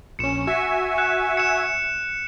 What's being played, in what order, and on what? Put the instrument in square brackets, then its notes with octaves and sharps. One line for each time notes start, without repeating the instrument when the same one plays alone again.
[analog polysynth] A#1 C#4 [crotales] C#7 E7
[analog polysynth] F#4 E5 G#5
[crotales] F#6 C#7 E7
C#7 E7